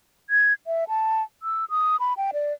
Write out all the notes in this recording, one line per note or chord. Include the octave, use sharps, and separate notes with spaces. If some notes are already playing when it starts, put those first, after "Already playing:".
G#6
E5
A5
E6
D#6
B5
G5
D5